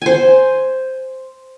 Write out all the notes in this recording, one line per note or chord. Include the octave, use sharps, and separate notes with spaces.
C5 G#5